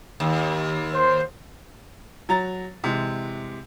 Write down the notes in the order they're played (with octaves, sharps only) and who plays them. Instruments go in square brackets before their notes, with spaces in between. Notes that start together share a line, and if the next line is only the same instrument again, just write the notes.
[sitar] D#2
[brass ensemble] C5
[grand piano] F#3 A#5 A6
C3 E3 G#3